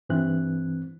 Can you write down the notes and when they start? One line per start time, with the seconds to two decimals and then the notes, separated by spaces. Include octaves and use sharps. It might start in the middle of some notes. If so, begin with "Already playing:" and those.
0.09 G2 E3 C4 F#6